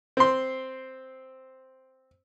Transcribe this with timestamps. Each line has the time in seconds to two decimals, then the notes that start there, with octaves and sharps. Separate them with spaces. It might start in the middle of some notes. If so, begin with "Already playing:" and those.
0.17 C4 C6